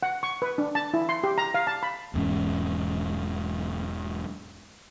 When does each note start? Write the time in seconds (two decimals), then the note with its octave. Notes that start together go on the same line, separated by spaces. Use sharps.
0.03 F#5
0.23 C#6
0.42 B4
0.58 D4
0.75 A5
0.94 E4
1.09 C6
1.24 G4
1.38 A#5
1.54 F5
1.67 A5
1.83 B5
2.14 E1 E2 G#2 C#4